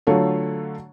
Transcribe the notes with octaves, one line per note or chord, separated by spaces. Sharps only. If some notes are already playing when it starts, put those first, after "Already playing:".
D3 F#3 A3 F4 A4 C#5